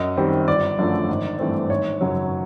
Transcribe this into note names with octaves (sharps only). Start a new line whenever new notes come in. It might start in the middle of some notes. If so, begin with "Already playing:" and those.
Already playing: F#2 D#5
D#3 G3 C4
G1 D5
F#2 D3 F3 A3
G#1
G2 E3 A3 C4
G#1 C#5
F#2 C#3 F#3